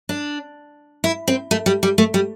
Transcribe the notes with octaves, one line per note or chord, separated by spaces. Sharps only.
D4
E4
C4
A3
G3
G3
A3
G3